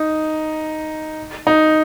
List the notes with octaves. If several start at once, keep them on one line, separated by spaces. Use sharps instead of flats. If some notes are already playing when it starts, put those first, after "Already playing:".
Already playing: D#4
D#4